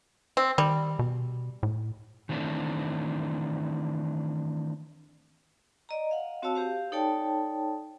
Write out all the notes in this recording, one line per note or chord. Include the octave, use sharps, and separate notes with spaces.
C4
D#3 G3
B2
A2
D#3 E3 A3 C4 D4
D5 D#5 A#5
F5 F#5
C4 F#4 C#5 F5 A5 E6
G4 C5 F5
D#4 A4 C#5 D5 G5 A5